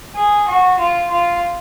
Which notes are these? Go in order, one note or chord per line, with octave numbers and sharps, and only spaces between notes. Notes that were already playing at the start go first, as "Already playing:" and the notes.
G#4
F#4
F4
F4